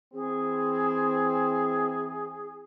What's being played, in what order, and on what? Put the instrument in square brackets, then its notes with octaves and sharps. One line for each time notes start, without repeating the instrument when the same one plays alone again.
[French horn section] E3 C4 [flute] G#4